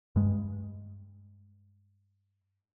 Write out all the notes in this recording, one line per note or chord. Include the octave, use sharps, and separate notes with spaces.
G2 G#3